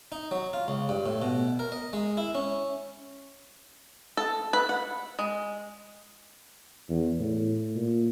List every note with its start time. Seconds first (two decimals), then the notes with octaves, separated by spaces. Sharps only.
0.12 D#4
0.31 F#3
0.53 F4
0.68 C#2
0.89 G2
1.06 A2
1.22 B2
1.59 A#4
1.72 D#5
1.93 G#3
2.17 E4
2.35 C#4
4.17 A4
4.53 B4
4.69 F#5
5.19 G#3
6.89 E2
7.19 A2
7.76 A#2